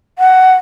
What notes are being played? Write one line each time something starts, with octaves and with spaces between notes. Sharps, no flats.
F#5